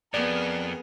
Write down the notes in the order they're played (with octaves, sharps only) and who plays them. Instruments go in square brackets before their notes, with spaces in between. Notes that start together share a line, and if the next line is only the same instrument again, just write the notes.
[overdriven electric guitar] F2 [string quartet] B3 G#4 A#4 [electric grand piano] D5